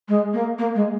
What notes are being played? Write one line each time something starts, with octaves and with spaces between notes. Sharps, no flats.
G#3
A#3
A#3
G#3